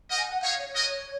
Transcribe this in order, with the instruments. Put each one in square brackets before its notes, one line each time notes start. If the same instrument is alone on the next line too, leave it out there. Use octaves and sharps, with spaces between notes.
[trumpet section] D#4 A#4 D#5 [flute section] F#5
[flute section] G#5
F#5
[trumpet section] D#4 G#4 C#5 [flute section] F5
[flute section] C#5
[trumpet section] F#4 A#4 D#5